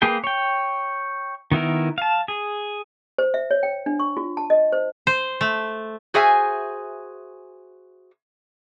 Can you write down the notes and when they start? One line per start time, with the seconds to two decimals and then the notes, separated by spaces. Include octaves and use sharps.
0.02 A#3 G#4 B4 G5
0.24 C#5 G5
1.52 D#3 B3 E4 A#4
1.98 F5 A5
2.28 G#4
3.18 C5
3.34 E5
3.51 C#5
3.63 G5
3.86 D4
4.00 C#6
4.17 F4
4.37 A5
4.50 D#5
4.72 C5
5.07 C5
5.41 A3
6.14 F#4 G#4 C5 E5 G#5